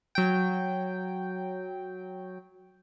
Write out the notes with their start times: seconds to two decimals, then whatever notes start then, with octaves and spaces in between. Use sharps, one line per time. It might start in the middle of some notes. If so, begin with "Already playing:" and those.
0.15 F#3 G5